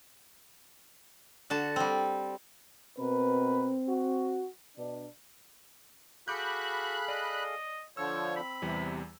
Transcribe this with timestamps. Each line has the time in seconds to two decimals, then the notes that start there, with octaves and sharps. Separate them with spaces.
1.50 D3 F#4 A5
1.76 G3 C4
2.99 B2 C4 A#4 B4
3.88 F#4
4.77 B2 D4
6.28 F#4 G#4 A4 F5 B5 D6 F#6 G6
7.08 D5 D#5
7.97 D3 F3 F4 C#5 E6
8.36 C4 B5
8.62 E2 C3 E3 G3